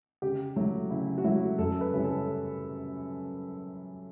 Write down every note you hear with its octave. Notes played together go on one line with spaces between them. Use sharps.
C#3 G4
F#3 A3 E4
C#3 E4
F#4
F#3 A3 E4
F#2 A4
B4
C#3 G3 C#4 E4
A4